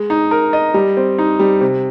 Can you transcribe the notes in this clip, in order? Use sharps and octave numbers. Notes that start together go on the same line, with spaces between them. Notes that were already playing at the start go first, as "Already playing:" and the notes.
Already playing: G#3
D#4
A#4
D#5
G3
C4
D#4
G3
C3